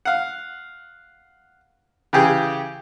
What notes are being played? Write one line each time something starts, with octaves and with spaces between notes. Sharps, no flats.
F5 F#5
C#3 E3 G4 G#4